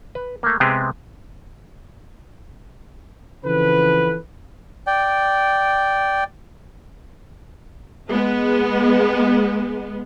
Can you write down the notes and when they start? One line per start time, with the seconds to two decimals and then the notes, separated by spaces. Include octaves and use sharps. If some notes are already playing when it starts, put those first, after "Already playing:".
0.15 B4
0.43 A3 A#3
0.60 C3 G#3 B3 C4 G4 G#4
3.44 C#3 E3 F3 C4 A4 B4
4.87 D5 G5
8.10 G#3 B3